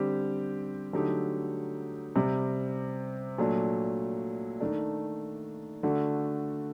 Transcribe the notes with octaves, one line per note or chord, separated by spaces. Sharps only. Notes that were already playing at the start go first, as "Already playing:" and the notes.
Already playing: D3 G3 C4 G4
D3 F#3 A3 D#4 G4
C3 G3 C4
A#2 F#3 A3 D4
D#3 A3 D4
D3 A3 D4 F#4